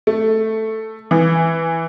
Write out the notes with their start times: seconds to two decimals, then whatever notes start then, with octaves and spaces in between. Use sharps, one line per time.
0.07 A3
1.11 E3